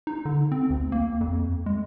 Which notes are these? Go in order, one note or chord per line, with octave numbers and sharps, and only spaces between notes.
D#4
D3
C4
D2
A#3
F2
G#3